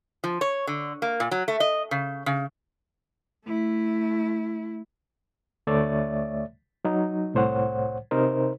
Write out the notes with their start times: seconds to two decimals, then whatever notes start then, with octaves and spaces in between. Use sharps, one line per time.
0.24 F3
0.41 C#5
0.67 D3
1.02 A#3
1.20 A#2
1.31 F#3
1.48 A3
1.60 D#5
1.91 C#3
2.26 C#3
3.45 A3 E4
5.67 D2 A3 C#5 D5 E5 A6
6.85 F#3 D#4
7.34 C2 A2 C5 C#5 F#5
8.11 C3 D#4 A#4 C5